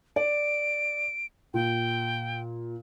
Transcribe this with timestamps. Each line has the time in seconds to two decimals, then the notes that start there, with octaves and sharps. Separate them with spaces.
0.16 D5 D7
1.54 A#2 G5